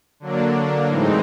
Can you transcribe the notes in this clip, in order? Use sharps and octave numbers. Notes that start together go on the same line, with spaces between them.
D3 F#3 A#3 D4
A2 E3 G#3 C4 D#4